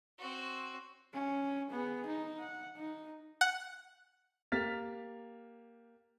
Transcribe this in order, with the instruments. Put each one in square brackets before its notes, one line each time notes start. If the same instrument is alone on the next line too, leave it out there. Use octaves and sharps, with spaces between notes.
[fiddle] C4 F#4
[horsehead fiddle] C#4
B3 G#4
D#4
F#5
D#4
[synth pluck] F#5
[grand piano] A#3 G4 F6 A6 B6 F7